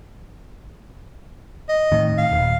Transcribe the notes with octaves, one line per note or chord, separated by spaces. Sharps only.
D#5
A2 D#3
F5
D#1